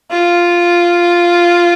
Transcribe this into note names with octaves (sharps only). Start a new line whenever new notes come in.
F4